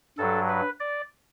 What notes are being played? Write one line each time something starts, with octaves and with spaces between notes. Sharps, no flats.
G2 F#3 A4
B4
D5